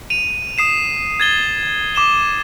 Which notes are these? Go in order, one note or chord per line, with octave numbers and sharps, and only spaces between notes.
D#7 F7
D#6 C7 E7
G#6 A6 G7
D6 E7 G7